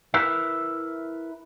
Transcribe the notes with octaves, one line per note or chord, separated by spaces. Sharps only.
E4 A#4 B4 E5